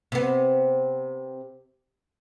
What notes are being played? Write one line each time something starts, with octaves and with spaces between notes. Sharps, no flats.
C3 B3